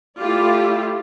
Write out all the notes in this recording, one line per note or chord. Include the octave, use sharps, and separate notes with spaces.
A3 E4 F4 G4 D5